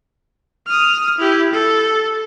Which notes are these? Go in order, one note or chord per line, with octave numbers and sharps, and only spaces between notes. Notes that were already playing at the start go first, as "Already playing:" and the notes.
D#6 F6
E4 G4
A4